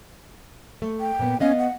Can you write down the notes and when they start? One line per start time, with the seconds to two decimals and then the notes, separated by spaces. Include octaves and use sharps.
0.82 A3
1.00 G5
1.19 A#2 B3
1.40 B3 C#4 D#5 F5
1.59 F#5